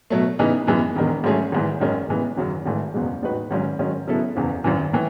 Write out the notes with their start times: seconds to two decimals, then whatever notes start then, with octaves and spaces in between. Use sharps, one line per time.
0.10 B2 F#3 A3
0.39 C#3 E3 B3 D#4
0.67 F#2 E3 G#3 B3
0.95 E1 E2 D#3 G#3
1.24 G#2 F#3 A3 C#4 G#4
1.52 G#1 G#2 E3
1.80 G#1 F#2 D#3 G#3 C#4
2.09 C#3 E3 G#3 B3
2.37 G#1 F#2 C#3 F#3
2.66 G#1 G#2 E3 A3
2.94 F#1 E2 B2 G#3
3.23 A2 G#3 D#4 F#4 B4
3.51 G#1 G#2 F#3 C#4
3.79 G#2 D#3 F#3 C#4
4.08 C#3 F#3 B3 E4 A4
4.36 F#1 E2 C#3 E3
4.64 G#1 F#2 E3
4.93 A2 E3